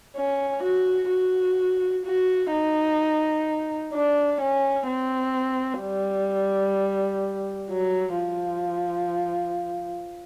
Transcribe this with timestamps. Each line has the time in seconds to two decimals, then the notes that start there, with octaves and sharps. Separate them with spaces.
0.17 C#4
0.64 F#4
1.11 F#4
2.06 F#4
2.52 D#4
3.94 D4
4.41 C#4
4.88 C4
5.82 G3
7.70 F#3
8.17 F3